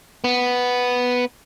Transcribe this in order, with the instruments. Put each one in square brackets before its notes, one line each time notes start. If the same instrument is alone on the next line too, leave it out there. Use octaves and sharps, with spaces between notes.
[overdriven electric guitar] B3